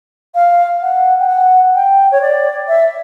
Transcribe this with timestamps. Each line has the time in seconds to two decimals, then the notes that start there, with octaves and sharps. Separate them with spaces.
0.34 F5
0.81 F#5
1.19 G5
1.27 F#5
1.75 G5
2.11 C#5
2.21 D5
2.68 E5